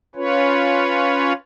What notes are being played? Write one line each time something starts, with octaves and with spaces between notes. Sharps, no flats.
C#4 F4 B4 C#5